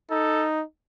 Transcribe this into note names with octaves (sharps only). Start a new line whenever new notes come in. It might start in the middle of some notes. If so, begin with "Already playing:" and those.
D#4 A4